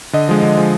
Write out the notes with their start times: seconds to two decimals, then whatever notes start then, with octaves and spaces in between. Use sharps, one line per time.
0.13 D3 D#5
0.28 F3 G#3
0.42 D3
0.57 F3 G#3